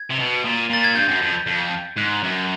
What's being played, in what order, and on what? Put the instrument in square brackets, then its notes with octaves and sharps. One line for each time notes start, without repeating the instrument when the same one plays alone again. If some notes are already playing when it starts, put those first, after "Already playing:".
Already playing: [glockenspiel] G#6
[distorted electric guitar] C3
B2
A#2
[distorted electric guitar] A#2 [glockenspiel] A6
[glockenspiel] G#6
[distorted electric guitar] G2 [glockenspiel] G6
[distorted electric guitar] F#2
F2
F2
[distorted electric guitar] G#2 [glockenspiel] F#6
[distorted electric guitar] F#2